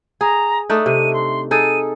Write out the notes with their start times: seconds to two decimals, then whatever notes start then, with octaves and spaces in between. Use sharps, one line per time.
0.21 G#4 A#5
0.70 A3 D4 D#4 D#6
0.86 C3 D#7
1.13 C6
1.51 D#4 G#4 A4 D#7